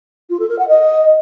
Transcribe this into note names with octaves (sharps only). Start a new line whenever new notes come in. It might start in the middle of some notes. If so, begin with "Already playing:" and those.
F4
A4
A#4
F#5
D#5